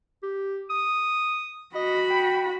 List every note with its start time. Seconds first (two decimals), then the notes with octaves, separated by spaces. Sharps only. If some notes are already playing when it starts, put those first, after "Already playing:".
0.23 G4
0.70 D#6
1.75 F#4 D#5 B5
2.11 G5